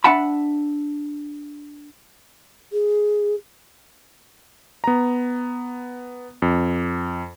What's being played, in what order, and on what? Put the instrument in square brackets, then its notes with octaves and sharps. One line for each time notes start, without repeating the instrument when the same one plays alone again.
[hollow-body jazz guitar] D4 E5 F#5 A5 B5
[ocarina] G#4
[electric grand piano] B3 A#5
F2